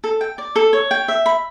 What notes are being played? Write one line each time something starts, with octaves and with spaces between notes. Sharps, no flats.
A4
G5
D5
A4
C#5
G5
E5
B5